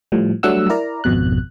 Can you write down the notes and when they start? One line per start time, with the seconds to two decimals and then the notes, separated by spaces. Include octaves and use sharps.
0.12 A2 F3 G3
0.43 F#3 G3 A3 D4 F#5 E6
0.69 E4 A#4 D5 A#5
1.04 G#1 F2 B2 F#6